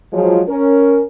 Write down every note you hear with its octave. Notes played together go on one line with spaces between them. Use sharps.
F3 F#3 G#3
C#4 A#4